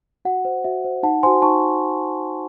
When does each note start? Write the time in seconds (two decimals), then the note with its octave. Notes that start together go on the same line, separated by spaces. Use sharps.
0.25 F#4 F#5
0.45 C5
0.64 F#4 E5
0.84 C5
1.03 D#4 F#5 A5
1.23 F#4 C5 G#5 C6
1.42 D#4 A5 C#6